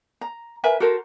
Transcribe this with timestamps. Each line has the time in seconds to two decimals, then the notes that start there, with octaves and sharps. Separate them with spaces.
0.21 A#5
0.64 A#4 B4 E5 G#5
0.80 F#4 A4 A#4 C5